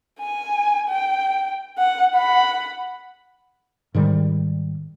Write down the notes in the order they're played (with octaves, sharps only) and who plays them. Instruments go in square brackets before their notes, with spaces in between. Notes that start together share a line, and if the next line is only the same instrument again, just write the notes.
[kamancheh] G#5
G5
F#5
F#5 B5
[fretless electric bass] G#2 D#3 G3